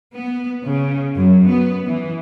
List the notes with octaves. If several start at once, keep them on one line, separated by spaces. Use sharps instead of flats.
B3
C#3
F#2
B3
E3